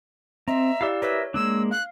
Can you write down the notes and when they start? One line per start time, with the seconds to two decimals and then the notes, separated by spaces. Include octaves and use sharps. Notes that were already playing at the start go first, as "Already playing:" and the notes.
0.48 C4 D#5 E5 A#5
0.81 E4 G4 D5 F5 E6
1.02 A#4 B4 C#5 E5 E6
1.34 G#3 A#3 D4 E6
1.71 F5 F#6